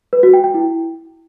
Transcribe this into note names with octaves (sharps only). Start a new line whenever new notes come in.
B4
F#4
G5
G5
E4